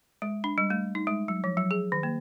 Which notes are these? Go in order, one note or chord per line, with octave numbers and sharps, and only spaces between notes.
G#3
D4
G3
A3
D#4
G#3
F#3
F3
F#3
G#4
D#3
A#3